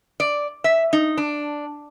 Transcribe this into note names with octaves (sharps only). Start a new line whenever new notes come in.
D5
E5
D#4
D4